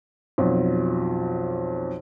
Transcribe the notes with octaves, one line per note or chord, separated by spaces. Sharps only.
B1 F2